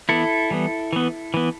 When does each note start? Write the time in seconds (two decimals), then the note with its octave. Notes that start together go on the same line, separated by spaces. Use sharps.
0.09 E3 B3 E4 A4
0.51 E3 G3 B3
0.93 E3 B3
1.34 E3 B3